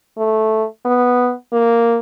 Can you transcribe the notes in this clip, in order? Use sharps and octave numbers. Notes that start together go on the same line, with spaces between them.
A3
B3
A#3